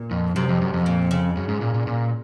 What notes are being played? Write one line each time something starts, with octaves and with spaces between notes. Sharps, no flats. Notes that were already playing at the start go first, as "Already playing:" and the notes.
Already playing: A#2
F2
F#2 C3
F2
F#2
F2
A#2
C#3
F#2
G#2
A#2
A#2
A#2